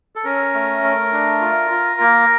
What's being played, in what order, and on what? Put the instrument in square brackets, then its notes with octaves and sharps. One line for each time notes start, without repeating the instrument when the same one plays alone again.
[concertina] A4
C#4 A#4
A3
A3
D4
F4
F4
A#3